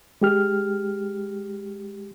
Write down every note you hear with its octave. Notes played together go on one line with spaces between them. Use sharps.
G#3 G4 F6